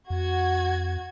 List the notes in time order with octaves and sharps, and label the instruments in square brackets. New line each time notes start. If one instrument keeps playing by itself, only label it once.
[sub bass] F2 [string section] F#4 G#6